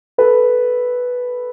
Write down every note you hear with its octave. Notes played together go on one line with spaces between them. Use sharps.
A4 B4